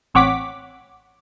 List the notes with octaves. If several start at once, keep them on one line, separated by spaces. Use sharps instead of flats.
A1 C4 C#5 F#5 D6 B6